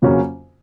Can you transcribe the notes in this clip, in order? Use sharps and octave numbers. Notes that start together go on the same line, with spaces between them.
F2 C#3 F#3 A#3 C#4